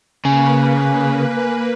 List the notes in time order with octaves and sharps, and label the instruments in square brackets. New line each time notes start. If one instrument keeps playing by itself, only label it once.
[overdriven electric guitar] C#3 [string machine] A#3 B4 [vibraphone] G#5